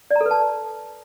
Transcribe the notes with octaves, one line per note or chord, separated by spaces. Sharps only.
D5
A#5
A4
B4
A5